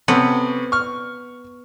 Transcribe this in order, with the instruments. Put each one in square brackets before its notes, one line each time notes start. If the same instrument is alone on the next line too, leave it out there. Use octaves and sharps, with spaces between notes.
[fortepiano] C3 C#4 A4 [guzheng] B3
[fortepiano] C#6 F6